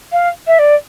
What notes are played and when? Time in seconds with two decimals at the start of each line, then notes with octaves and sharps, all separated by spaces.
0.12 F5
0.47 E5
0.59 D5